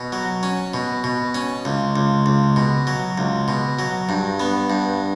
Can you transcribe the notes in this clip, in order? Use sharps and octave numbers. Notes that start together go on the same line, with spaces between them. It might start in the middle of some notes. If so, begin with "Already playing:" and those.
Already playing: B2
F#3
C#4
B2
B2
C#4
C#2
C#2
C#2
B2
F#3
C#2
B2
F#3
G2
B3
G2